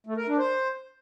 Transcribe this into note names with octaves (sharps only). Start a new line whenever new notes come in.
A3
A#4
D4
C5